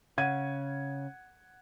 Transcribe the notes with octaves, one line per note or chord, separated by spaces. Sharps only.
C#3 F#5 G#6 D#7